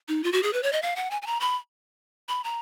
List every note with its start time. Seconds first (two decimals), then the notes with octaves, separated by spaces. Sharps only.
0.08 D#4
0.24 F4
0.32 F#4
0.43 G#4
0.53 B4
0.63 C#5
0.73 D#5
0.82 F5
0.96 F#5
1.11 G#5
1.22 G#5
1.27 A#5
1.40 B5
2.29 B5
2.44 A#5